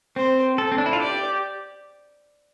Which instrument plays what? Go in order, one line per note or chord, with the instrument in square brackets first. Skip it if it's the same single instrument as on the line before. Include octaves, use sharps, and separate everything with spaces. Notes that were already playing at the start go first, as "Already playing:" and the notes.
[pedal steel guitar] C4 [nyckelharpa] C5
[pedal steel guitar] A4
C4
D4
E4
F4
[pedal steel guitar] G4 [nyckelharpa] D5